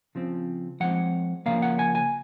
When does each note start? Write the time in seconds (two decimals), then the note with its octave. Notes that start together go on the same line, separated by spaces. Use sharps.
0.15 C#3 F3 C4
0.80 F3 G#3 C4 F#5
1.46 C#3 F3 A#3 F5
1.62 F#5
1.79 G#5
1.95 G#5